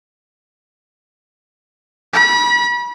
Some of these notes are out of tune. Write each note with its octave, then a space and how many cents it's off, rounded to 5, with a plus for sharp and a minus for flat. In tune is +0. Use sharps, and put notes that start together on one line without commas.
B5 -35